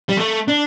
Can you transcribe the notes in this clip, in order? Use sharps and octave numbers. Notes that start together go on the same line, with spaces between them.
G3
A3
D4